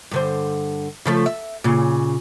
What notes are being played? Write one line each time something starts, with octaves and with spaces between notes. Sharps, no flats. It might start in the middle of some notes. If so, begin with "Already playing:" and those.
G2 D3 C5
C#3 F3 A3
E5
A#2 C#3